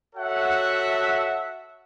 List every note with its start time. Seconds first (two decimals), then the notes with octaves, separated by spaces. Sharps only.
0.15 F#4 A4 C#5 E5 F#5